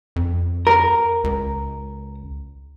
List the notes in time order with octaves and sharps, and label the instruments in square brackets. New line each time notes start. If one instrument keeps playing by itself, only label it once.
[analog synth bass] F2
[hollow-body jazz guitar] A#4
[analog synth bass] C#2